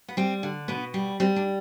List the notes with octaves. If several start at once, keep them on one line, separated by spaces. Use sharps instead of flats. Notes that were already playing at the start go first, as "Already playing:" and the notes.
B3
G3 C4
D3
B2 B3
G3
G3 C4
D4